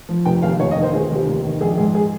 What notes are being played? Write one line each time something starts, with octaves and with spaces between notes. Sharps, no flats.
F3
F1 G5
D#2 F5
F1 C#5
D#5
D#3
C5
F1 G#4
D#2
G4
F1
D#3
A#1 G#4
G#2 G#4
G#4